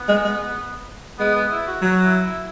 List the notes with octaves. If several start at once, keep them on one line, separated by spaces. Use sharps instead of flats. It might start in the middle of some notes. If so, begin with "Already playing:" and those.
Already playing: B3
G#3
G#3
G#3 B3
B3
E4
F#4
F#3 F#4
E4
E4